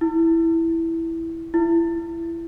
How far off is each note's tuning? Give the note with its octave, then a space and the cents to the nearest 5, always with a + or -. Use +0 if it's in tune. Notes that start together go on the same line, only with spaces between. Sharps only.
E4 +0
E4 +20